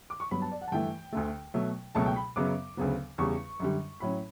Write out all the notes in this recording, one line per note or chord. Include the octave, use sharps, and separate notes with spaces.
D6
C#6
G2 F#3 B3 B5
A5
D5
F#5
A5
G2 E3 A3 G5
D2 D3 A3
B2 F#3 A3
C#2 B2 F#3 A3 A5
G5
B5
F#2 C#3 F#3 B3 D6
D2 C#3 F#3 B3
E2 C#3 G3 C#6
F#2 D3 G3
A2 F#3 C#4 B5